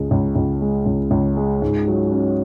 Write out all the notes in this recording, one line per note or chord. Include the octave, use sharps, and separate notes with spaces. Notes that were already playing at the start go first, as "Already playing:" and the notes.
Already playing: C#2 G#3
C#2
C#2
G#3
C#2
C#2
G#3
G#2
F#3
C#4